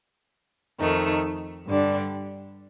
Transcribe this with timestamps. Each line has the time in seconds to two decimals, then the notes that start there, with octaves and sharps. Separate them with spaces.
0.80 F2 D#3 A3 D#4
1.67 G2 D3 G3 D4